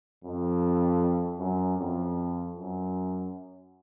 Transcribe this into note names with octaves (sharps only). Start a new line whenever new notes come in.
F2
F#2
F2
F#2